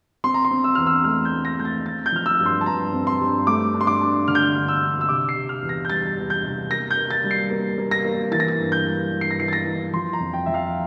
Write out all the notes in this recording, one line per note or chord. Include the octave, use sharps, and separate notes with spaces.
C4 C6
A#5
C6
C4
E6
E2 F6
E6
A3 F6
G6
A3
A#6
A3 G6
A6
C4 A6
G6
F3 F6
E6
G2
C6
A5
G2 A#5
C4
C6
G2
A3 D6
D4
C6
D6
D4
D3 F6
G6
F6
D4
E6
D4
E6
C3 D6
C7
C3
F6
E2
A#6
G6
G3 A6
E2
G6
C3
A#3 A#6
G6
A#3
A6
G3
C7
A#3
A#3
A#6
A#3
E3 A6
A#6
A6
G2
G6
G3
G2
C7
A#6
E3 C7
A6
A#6
E3
F3 C6
A#5
F2
G5
F3 E5
F5